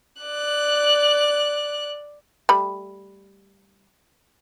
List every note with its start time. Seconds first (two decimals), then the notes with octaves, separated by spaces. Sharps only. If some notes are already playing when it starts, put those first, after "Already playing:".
0.22 D5 F#6
2.49 G3 A3 B5